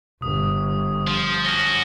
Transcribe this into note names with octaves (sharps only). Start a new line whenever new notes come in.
G1 D#6
F3
C#4 F#4 A#6 G7